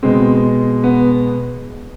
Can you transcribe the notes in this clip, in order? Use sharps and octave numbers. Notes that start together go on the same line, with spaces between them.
B2 G#3 C4
B3